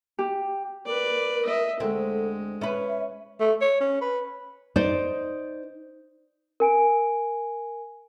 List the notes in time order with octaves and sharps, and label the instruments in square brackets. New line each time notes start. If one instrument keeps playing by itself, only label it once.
[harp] G4
[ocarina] A#4 [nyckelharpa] B4 D5
[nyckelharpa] D#5 E5
[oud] D2 C4 [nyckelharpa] G#3 [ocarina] A4
[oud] C#4 B4 [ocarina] E5
[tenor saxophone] A3
C#5
C#4
B4
[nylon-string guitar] D#4 C5 D5
[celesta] A#4 G#5 D7